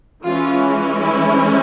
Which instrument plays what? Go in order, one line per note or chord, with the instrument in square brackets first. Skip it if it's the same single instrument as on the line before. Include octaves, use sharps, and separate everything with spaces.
[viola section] E3 G#3 C#4 F4
E4